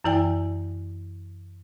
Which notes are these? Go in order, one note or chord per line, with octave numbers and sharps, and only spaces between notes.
F#2 E3 E4 D5 G5 G#5